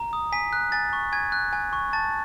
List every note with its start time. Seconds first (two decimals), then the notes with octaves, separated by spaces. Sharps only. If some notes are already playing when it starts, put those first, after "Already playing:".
Already playing: A#5
0.13 D#6
0.32 G#5 B6
0.53 F#6
0.72 G#5 A6
0.93 C#6
1.12 G#5 G#6
1.32 F#6
1.53 G#5
1.73 C#6
1.93 A5 A6